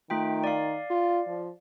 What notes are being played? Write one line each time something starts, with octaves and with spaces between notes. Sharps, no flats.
D#3 A3 F4 G5
D5 F5
F4
F3